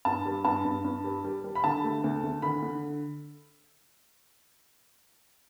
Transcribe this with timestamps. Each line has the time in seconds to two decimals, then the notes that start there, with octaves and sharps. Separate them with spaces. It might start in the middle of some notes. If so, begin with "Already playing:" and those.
0.05 G2 A5
0.25 G3
0.45 G2 A5
0.65 G2
0.84 G2
1.04 G3
1.24 G3
1.44 G3
1.55 B5
1.64 D3 A5
1.84 A3
2.04 D2
2.23 D2
2.42 D3 B5
2.63 D3